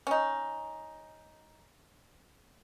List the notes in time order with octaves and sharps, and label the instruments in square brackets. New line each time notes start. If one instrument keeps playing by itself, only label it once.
[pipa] C#4 D#4